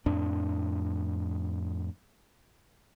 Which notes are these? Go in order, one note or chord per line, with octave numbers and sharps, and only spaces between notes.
F2 A2 D4